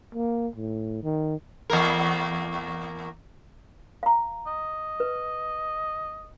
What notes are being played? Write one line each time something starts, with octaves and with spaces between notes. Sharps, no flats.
A#3
A2
D#3
E2 A#3 A#4
F5 A#5
D#5
B4